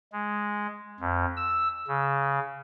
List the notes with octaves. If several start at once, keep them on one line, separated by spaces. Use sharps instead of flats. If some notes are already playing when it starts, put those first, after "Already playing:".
G#3
F2
E6
C#3